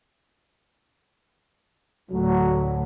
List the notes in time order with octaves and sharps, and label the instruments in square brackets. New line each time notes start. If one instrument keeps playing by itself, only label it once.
[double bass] D2 A2 [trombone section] F#3